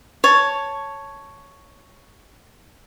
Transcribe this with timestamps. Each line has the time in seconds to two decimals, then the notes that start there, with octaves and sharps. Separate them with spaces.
0.24 C#5 A5